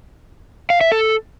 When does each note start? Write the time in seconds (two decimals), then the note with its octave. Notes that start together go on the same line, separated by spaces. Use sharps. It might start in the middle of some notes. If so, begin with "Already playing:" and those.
0.70 F5
0.81 E5
0.92 A4